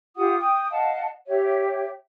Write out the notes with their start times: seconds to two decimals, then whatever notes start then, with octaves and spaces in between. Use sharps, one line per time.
0.16 F4 G4 F#5 D#6
0.40 G5 D#6
0.70 D#5 F5 F#5 A5
1.27 G4 C#5 E5